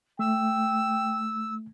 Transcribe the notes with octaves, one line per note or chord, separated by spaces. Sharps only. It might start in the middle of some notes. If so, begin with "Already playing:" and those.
A3 G5 E6